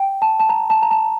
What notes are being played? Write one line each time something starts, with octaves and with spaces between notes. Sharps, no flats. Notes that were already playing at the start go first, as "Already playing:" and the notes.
Already playing: G5
A5
A5
A#5
A5
A#5
A5